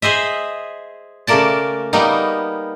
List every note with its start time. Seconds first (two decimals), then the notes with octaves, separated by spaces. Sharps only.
0.02 G#4 C5 D#5 E5
1.27 C#3 A3 A#3 A#4 D5 A5
1.93 G3 A#3 B3 D#4